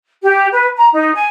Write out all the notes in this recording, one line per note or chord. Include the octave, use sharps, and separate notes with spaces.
G4
B4
A#5
D#4
G#5